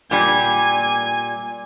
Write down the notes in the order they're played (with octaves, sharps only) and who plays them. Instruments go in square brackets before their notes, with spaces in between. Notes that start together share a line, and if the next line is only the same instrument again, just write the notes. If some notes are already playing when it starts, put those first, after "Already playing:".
[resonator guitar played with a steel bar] A#2 G3 [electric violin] G#5